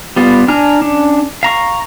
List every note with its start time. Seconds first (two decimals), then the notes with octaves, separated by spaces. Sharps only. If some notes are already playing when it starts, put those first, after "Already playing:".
0.16 G3 B3 F4
0.48 D4 G#5 A#5 F6
0.82 C#4 D4
1.43 F5 A#5 C#6